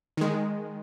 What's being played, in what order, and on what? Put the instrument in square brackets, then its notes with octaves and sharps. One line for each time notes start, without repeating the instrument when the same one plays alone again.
[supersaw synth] D#3 G#3